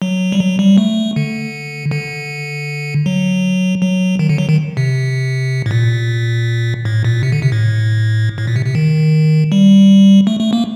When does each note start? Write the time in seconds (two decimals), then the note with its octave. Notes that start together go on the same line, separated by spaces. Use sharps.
0.02 F#3
0.32 G3
0.40 F#3
0.59 G3
0.78 A3
1.16 D3
1.91 D3
3.06 F#3
3.82 F#3
4.19 D#3
4.29 D3
4.38 F#3
4.49 D#3
4.77 C3
5.66 A2
5.71 A#2
6.85 A2
7.04 A#2
7.23 C3
7.32 D3
7.42 C3
7.52 A2
8.38 A2
8.47 A#2
8.56 C3
8.66 C3
8.75 D#3
9.52 G3
10.27 A3
10.40 A3
10.53 A#3